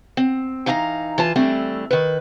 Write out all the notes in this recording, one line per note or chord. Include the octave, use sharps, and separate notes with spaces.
C4
E3 D#4 F5 A5 A#5
E3 F4 A5
E3 G3 A3 C4 D4
D#3 B4